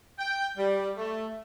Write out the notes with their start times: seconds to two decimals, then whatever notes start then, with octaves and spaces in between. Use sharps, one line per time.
0.19 G5
0.57 G3
0.96 A3